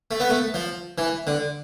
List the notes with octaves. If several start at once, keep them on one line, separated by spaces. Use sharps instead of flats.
A3
B3
A3
F3
E3
D3